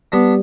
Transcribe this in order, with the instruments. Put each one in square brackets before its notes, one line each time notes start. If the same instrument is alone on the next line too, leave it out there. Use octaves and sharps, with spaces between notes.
[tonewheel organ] G3 [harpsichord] B3 D4